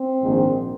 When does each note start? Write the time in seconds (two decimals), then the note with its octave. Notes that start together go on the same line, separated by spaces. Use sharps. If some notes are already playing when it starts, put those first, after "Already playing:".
Already playing: C4
0.22 A#1 G#2 D#3